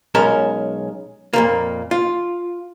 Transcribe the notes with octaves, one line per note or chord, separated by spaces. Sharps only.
B1 G#3 C#4 A#4 A5
F2 A#2 A#3
F4